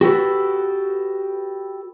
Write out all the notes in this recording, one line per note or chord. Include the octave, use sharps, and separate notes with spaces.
F#4 G4 A4 B4